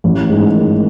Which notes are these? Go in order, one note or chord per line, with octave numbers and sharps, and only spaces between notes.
A1
G#2
D#3